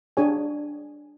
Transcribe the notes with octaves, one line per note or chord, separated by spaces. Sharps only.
D4 G#4 C#5 G#5